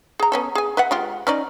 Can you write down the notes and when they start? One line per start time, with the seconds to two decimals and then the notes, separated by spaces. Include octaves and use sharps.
0.20 G#4 A#5
0.32 B3 C#4 A4
0.55 G#4 G#5
0.77 B4 E5 F#5
0.91 G#3 F4 G4
1.27 C#4 D#4 D5